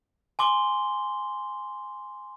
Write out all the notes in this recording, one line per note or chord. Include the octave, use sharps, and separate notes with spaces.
G#5 C6 D6 G7